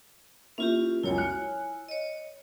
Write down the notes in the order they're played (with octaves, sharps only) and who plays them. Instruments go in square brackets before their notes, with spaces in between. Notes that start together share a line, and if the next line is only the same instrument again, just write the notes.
[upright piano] A#3 E4 [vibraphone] C#4 F4 G4
[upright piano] C#2 F#2 [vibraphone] E4 C#5 G#5
[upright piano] F6 F#6 C#7
[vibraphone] C#5 D#5